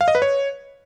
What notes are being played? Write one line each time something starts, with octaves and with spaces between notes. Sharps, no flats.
F5
D#5
B4
C#5